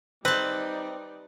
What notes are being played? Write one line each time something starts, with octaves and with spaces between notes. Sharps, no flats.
G3 C4 D#4 B4 D5 A5